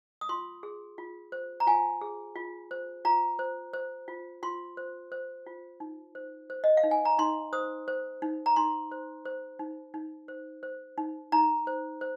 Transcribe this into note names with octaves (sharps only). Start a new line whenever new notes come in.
D#6
F4 C6
G#4
F4
C5
A#5
F4 G#5
G#4
F4
C5
F4 A#5
C5
C5
F4
F4 C6
C5
C5
F4
D#4
C5
C5
D#5
F5
D#4
G#5
A#5
D#4 C6
C5 D#6
C5
D#4
A#5
D#4 C6
C5
C5
D#4
D#4
C5
C5
D#4
D#4 A#5
C5
C5